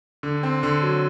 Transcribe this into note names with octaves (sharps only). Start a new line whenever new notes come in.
D3
C4
D3
F#3